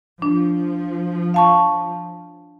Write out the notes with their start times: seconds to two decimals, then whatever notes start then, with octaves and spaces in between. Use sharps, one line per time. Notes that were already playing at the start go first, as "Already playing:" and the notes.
0.22 F3 D4
1.34 F5 A5 C#6